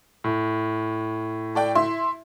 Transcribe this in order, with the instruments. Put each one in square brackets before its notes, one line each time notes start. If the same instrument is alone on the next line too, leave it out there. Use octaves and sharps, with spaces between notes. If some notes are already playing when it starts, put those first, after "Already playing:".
[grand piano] A2
[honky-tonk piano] A4 D5 G5
E4 E5 C6